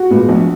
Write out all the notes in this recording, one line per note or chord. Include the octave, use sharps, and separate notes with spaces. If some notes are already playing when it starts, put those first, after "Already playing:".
Already playing: F#4
A#2 G#3 B3
A#1